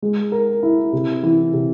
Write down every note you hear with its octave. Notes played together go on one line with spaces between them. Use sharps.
G#3
A#4
E4
C3
E3
C3